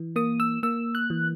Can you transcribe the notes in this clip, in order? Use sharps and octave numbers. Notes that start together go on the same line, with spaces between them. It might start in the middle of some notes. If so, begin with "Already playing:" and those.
Already playing: E3
A#3 D#6
E6
A#3 E6
F#6
E3